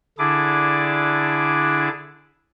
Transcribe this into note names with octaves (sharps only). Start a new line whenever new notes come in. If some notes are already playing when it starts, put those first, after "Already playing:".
D3 D4 E4 G#4 D6